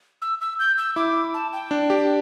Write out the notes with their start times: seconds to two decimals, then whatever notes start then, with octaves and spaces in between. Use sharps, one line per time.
0.22 E6
0.41 E6
0.59 G6
0.78 E6
0.96 E4 D6
1.34 A5
1.53 G5
1.71 D4
1.90 G4